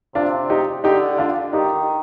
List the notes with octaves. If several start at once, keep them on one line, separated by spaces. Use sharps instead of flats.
C3 D4 F4
D#4 G4
D3 D#4 G4
D4 F4
D#3 D#4 G4